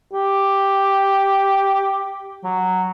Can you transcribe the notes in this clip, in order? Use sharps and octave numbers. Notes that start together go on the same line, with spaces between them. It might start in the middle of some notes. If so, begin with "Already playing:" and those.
G4
F#3